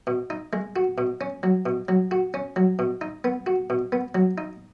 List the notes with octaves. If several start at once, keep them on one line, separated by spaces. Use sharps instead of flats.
B2
D#4
G#3
F#4
B2
C#4
F#3
B2
F#3
F#4
C#4
F#3
B2
D#4
B3
F#4
B2
B3
F#3
D#4